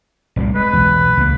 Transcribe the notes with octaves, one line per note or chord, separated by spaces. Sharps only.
F1 C2 A#2
G#3 B4
B1 E2
C#2 A#3